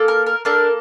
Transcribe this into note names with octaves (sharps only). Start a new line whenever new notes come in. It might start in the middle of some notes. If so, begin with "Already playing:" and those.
Already playing: A#3 A4
A#4
A#4
A#3 D4 A4 A#4